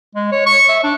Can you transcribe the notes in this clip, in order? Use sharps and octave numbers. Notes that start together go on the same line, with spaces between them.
G#3
C#5
C#6
E5
D4